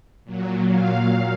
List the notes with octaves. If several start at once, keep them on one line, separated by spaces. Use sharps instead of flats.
A#2 F#3
F5